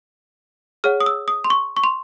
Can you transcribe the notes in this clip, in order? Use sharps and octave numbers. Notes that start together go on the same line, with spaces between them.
G#4 C#5 F#5 F6
D#6
E6
D#6
C6
C#6
C#6
C6